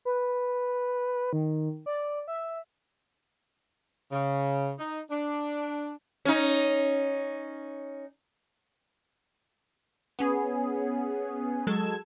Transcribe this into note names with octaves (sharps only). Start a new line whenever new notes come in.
B4
D#3
D5
E5
C#3
D#4
D4
C#4 D#4
B3 C#4 G#4
F#3 G#3 A4 G#6 E7